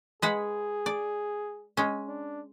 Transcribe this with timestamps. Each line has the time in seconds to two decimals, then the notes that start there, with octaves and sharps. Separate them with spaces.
0.22 G#3 G#4 B4 F#5
0.86 D5
1.77 G#3 C#4
2.08 D4